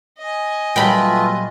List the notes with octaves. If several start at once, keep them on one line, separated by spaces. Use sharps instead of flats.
D#5 G#5
A#2 F#3 G3 A3 F4 B4 G5 B5